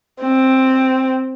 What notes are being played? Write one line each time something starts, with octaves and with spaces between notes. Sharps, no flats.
C4